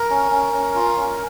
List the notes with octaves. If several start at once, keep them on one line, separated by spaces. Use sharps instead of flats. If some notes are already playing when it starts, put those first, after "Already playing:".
Already playing: A#4
C#4
C#4
C#4
F4
C#4